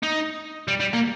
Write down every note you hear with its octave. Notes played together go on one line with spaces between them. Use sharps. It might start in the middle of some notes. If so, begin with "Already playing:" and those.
D#4
G3
G3
A#3